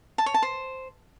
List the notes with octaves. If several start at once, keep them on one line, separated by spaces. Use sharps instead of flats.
A5
C#5
A5
C5